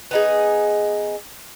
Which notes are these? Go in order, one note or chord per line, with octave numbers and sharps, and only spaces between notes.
B3 D#4 G#4